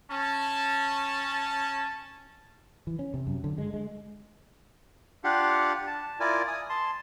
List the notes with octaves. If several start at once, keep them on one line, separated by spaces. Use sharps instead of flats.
C#4 A5
E3
C#4
C3
F#2
D3
G#3
G#3
D4 F4 G4 F5 F#5
A5
E4 F4 A#4 D5 G#5
G#5 D#6
A5 C6